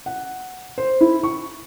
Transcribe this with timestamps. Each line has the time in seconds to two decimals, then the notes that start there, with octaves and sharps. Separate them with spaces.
0.06 F#5
0.78 C5
1.01 E4
1.23 C#6